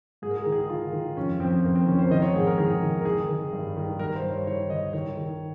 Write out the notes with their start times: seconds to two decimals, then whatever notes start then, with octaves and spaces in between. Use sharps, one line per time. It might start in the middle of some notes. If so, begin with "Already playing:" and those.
0.22 G#2 G#4
0.30 A#4
0.37 G#4
0.45 D#3 A#4
0.52 G#4
0.70 D#3 F4
0.93 D#3
1.17 F2 C#4
1.40 F2 C4
1.64 F2 A#3
1.75 C4
1.87 D#3 C#4
1.99 C5
2.11 D#3 D#5
2.22 C#5
2.34 G#2 G#4
2.47 A#4
2.58 D#3 G#4
2.82 D#3
3.01 A#4
3.05 D#3 G#4
3.29 D#3
3.53 G2
3.77 D#3
3.99 G2 A#4
4.16 C5
4.23 G2
4.31 C#5
4.47 D#3 C#5
4.70 D#3 D#5
4.93 D#3 C#5
5.17 D#3